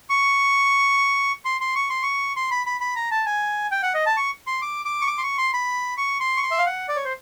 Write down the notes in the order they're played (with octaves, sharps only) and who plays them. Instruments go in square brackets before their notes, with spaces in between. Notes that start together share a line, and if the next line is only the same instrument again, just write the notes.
[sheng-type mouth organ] C#6
C6
C6
C#6
C6
C#6
C6
B5
B5
B5
A#5
A5
G#5
G5
F#5
D#5
A5
C#6
C6
D6
D6
C#6
D6
C6
C#6
C6
B5
C#6
C6
C#6
C6
E5
F5
F#5
D5
C#5
C5